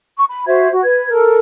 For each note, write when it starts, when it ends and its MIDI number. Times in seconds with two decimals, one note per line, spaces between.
0.17 0.24 85
0.29 0.46 83
0.47 0.69 66
0.47 0.69 72
0.47 0.69 76
0.47 0.69 92
0.72 0.82 66
0.83 1.10 71
0.83 1.10 92
1.10 1.39 69
1.10 1.39 70